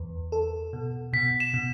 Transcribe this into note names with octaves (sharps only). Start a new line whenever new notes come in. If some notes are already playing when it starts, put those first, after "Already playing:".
Already playing: E2
A4
B2
B2 B6
E7
B2